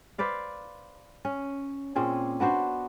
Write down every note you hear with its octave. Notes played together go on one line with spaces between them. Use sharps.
B4 C5 D5 F5
C#4
A#2 C4 C#4 G#4
B3 D4 F#4 C5